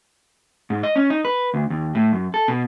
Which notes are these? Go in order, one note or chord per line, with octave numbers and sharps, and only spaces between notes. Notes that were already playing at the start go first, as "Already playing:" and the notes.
G#2
D#5
C#4
D#4
B4
D2
D#2
A2
F#2
A4
B2